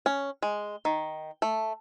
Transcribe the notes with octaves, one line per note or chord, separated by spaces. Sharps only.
C#4
G#3
D#3
A3